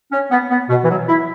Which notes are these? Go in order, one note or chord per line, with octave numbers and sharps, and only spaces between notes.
C#4
B3
B3
B2
E3
F#3
E4